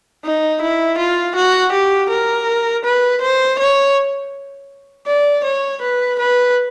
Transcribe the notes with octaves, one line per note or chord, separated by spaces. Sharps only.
D#4
E4
F4
F#4
G4
A#4
B4
C5
C#5
D5
C#5
B4
B4